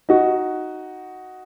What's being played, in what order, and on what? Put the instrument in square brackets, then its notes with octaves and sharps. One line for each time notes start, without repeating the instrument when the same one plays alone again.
[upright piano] D#4 F#4